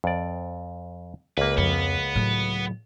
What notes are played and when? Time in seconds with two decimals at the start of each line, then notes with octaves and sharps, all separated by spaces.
0.04 F2 D5
1.38 C#2 A#3 B4
1.58 F2 B3
2.16 A2 F#3